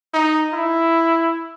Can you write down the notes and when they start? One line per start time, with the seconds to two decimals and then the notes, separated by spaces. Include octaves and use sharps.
0.14 D#4
0.53 E4